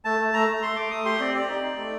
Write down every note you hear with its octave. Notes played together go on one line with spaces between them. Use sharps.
A3 A5
A3
A3 A#5
A3
A3 C6
A3 D6
A3 D#6
G4 C6
C4 D5
G4 D5
D#4 D5
D#4
A3